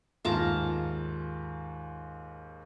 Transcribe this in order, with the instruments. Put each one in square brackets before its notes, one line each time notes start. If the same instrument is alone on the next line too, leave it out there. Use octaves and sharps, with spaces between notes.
[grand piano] D#2 G#2 [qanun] F4 A5 A#5